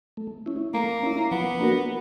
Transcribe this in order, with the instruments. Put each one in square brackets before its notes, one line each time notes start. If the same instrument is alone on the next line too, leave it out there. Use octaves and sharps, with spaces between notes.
[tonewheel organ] A3
C#4 E4
[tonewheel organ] A3 [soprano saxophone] A#3
[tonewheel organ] C#4 E4
[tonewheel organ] F3 [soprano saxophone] B3
[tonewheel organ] A#3 D4 F#4 A#4